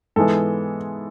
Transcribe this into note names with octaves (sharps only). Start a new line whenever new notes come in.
G#2 E3 G#3 B3 A4